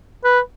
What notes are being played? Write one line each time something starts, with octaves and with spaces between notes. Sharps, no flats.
B4